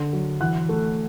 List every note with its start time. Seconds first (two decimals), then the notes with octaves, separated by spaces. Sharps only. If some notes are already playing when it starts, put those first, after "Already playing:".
Already playing: D3
0.13 F#3
0.41 E3 F#5 F#6
0.69 A3